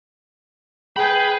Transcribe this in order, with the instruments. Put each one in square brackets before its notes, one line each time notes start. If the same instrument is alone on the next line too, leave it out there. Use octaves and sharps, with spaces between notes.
[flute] G#4 [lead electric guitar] B4 B5 [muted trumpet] G5